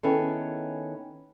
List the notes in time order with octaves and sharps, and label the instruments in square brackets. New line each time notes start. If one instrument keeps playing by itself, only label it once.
[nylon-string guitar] D#3 B3 C#4 E4 G#4 A4